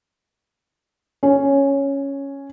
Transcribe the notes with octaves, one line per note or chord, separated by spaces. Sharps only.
C#4